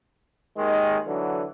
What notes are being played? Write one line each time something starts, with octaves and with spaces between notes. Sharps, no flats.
D#2 D#3 G#3
D3 E3 F#3